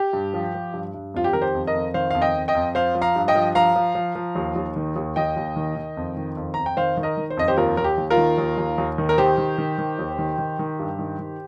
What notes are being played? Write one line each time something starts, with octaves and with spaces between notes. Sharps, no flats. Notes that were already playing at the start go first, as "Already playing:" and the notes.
Already playing: G4
G2
F3
F3
G2
G2
F2 F4
G4
D#3 A#4
G4 C5
F2
A#4 D#5
F2
D#3 C5 F5
F2 F5
D#5 G5
F2
D#5 G5
F2
F3 C5 F5
F3
F5 A#5
G2
D#5 G5
F3
F3 F5 A#5
F3
F3
F3
D#2
D#2
D#3
D#2
D#2 D#5 G5
D#2
D#3
D#3
F2
D#3
F2
F2 A#5
G5
D#3 C5 F5
D#3
A#4 D#5
D#3
C5
F2 D#5
G4 C5
D#2 F4 A#4
D#2 A#4
G4
D#2
F4 A#4
D#3
D#2
D#2
D#2
D#3
A#4
D#3 G4 C5
D#3
D#3
D#3
D#2
D#3
D#3
D#3
G2
D#3
D#3